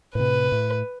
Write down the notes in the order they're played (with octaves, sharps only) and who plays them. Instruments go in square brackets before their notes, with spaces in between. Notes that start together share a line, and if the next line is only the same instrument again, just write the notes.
[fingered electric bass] A2 C3 [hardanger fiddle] B4
[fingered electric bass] A2